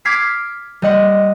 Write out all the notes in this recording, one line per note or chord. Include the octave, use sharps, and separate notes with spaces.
D6 F6 G#6 B6 C7
G3 D#5 F#5